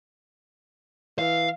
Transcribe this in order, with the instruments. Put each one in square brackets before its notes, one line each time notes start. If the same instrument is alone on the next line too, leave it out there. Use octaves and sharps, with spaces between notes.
[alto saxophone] E3 [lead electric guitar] F5